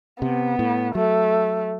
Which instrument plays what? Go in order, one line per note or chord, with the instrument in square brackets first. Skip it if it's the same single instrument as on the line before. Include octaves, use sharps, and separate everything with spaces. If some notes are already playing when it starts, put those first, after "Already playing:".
[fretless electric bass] C3 [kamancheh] B3
[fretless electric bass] A2
[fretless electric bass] F#3 [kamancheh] A3